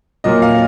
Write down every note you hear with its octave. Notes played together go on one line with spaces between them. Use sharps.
A#2 F#3 A#3 D#5
F5